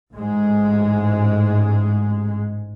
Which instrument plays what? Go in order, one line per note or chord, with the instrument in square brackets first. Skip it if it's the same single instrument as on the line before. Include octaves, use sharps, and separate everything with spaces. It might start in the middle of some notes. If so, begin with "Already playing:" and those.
[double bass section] A1 G#2 G#3